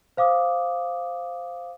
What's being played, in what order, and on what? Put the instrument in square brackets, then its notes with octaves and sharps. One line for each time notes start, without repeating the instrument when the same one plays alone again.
[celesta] C5 F5 D6 D#6